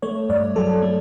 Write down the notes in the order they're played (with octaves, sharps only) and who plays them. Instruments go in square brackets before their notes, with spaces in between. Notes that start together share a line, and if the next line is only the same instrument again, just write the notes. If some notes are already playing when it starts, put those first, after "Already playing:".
[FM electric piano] A3 C#5
G2 D5
F#3 A4
A3